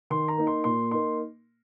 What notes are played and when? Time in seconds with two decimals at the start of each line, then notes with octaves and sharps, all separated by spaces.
0.10 D#3 C6
0.28 A#5
0.38 A#3 D#4
0.47 C6
0.64 A#2 C6
0.91 A#3 D#4 C6